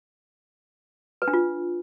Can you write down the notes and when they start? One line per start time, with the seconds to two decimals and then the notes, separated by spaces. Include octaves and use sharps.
1.22 B4
1.28 D4
1.33 F4